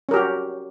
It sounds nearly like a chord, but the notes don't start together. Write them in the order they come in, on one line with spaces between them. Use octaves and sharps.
C#4 A#4 G4 F#4